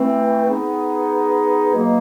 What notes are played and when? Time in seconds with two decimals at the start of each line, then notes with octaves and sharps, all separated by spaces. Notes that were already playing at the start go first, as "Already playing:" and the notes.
Already playing: E3 A3 C4
0.45 B3 D#4 G#4
1.71 B2 F#3 A#3 D#4